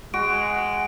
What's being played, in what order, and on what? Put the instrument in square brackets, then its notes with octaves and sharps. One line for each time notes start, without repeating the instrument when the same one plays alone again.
[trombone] G#3 [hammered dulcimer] F#4 [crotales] D7